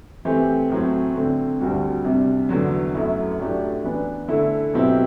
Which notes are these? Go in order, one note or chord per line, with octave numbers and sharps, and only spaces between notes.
E3 A3 C4 G4
A2 F#3 C4
D3 A3 C4
D2 D3 G3 D4 F#4
C3 G3 D4
E2 D3 F#3
F#2 F#3 A3 E4
A2 F#3 A3 D4 G4
E3 B3 D4
D3 A3 E4 A4
B2 F#3 C4 E4 G4